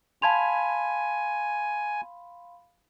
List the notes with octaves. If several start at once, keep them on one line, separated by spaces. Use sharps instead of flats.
F5 G#5 A5 B5 C6 G#6 F7